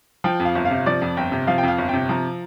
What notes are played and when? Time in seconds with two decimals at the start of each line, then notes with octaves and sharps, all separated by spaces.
0.24 F3 G5
0.40 F2
0.45 F5
0.55 G1
0.65 F5
0.71 C3
0.86 F3 D5
1.02 F2
1.17 G1 G5
1.32 C3
1.47 F3 F5
1.58 G5
1.63 F2 F5
1.78 G1
1.89 C3 G5
2.09 F3 A#5